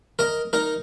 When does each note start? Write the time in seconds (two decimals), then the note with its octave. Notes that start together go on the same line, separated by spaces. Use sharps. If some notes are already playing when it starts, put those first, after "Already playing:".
0.19 A#4 D#5
0.53 D#4 A#4